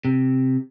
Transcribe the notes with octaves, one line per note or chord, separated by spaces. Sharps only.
C3